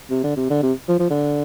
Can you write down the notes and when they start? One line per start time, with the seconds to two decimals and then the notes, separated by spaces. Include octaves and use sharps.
0.10 C3
0.24 D3
0.36 C3
0.50 D3
0.63 C3
0.88 F3
0.99 F3
1.10 D3